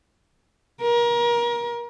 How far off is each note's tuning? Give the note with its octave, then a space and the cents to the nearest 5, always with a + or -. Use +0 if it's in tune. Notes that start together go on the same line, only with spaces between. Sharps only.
A#4 +30